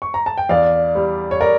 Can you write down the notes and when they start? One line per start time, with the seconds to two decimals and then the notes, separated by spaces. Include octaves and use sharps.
0.02 C#6
0.14 A#5
0.26 A5
0.38 G5
0.49 E2 D5 F5
0.95 G3
1.31 C#5
1.41 A#4 D5